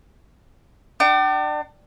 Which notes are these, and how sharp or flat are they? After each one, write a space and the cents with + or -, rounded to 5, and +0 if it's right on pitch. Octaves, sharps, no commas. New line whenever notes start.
D4 +30 G5 -40